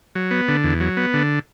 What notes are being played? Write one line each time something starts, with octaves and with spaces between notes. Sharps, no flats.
F#3
B3
D3
E2
F#3
B3
D3